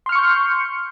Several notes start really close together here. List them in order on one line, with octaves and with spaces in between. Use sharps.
C6 F6 C#7 C#6 G6